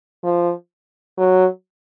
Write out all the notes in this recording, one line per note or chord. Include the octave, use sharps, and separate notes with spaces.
F3
F#3